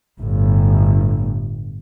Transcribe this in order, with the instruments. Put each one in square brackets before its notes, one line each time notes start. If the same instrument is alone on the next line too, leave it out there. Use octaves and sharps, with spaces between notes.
[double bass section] G1 A2